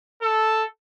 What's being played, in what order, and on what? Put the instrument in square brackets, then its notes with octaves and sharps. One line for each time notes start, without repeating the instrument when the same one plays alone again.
[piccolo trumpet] A4